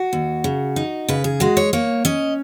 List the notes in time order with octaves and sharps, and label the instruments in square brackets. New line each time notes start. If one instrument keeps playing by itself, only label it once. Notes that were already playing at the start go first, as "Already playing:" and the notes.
Already playing: [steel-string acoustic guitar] F#4
D#2
C#3
D#4
C#3 B4
G#4
G#3 F#4
C#5
A#3 C#5
C#4 D#5